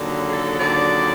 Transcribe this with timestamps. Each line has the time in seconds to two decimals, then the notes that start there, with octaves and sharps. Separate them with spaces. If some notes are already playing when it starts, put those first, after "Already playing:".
Already playing: D#2 D3 F#3
0.28 G#4
0.32 A4
0.58 D#2 D3 F#3 D5